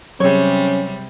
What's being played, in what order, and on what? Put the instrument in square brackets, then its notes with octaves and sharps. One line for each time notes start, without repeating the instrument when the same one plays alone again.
[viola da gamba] C3 G3 [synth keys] F#3 G#4 [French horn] C#4 [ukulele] C#5